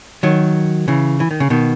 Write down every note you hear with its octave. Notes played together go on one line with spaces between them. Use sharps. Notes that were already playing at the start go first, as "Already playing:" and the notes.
D#3 F#3
C#3 E3
E3
D#3
C#3
B2 D#3